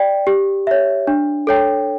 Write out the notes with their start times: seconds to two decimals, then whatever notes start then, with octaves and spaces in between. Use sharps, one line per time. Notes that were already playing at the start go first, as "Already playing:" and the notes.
Already playing: D5 G5
0.27 G4
0.67 C#5 E5
1.07 D4
1.47 A4 C#5 G5